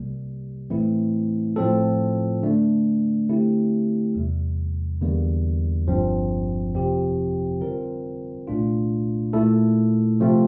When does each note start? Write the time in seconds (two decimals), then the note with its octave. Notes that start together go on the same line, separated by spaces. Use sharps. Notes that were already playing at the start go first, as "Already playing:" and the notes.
Already playing: C2 C3 G3 A#3
0.70 A2 E3 A3 C4 E4
1.56 A2 F3 C4 F4 A4
2.43 D3 A3 D4
3.29 D3 A3 C4 E4 G4
4.15 E2 C3 G3
5.02 E2 D3 G3 A#3
5.88 G1 G2 F3 C4
6.74 F2 C3 F3 C4 G4
7.60 D3 G3 C4 F4 A#4
8.47 C2 A#2 A3 D4 F4
9.33 A#2 A3 E4 A4
10.20 C3 F3 A3 C4 F4